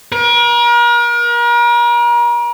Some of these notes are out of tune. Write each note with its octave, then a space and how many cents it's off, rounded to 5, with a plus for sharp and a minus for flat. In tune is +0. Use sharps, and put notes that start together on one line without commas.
A#4 +40